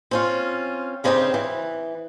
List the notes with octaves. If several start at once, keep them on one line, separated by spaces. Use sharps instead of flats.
C4 C#4 F4
G2 C#3 C4 D#4 E4 G4
E3